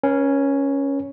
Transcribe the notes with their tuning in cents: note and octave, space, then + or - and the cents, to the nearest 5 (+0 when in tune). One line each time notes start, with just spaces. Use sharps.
C#4 +0 B4 -45